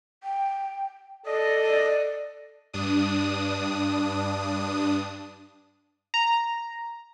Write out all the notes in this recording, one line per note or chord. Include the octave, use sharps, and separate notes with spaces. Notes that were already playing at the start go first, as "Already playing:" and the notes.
G5
A4 D5 D#5
G2 D4 D#6
A#5